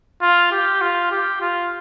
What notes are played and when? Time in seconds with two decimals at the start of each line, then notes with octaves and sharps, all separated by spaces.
0.21 F4
0.52 G4
0.81 F4
1.11 G4
1.41 F4